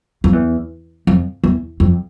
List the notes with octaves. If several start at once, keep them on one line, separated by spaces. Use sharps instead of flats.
F2
E2
F2
E2
F2